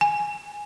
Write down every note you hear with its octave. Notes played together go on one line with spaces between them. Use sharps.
G#5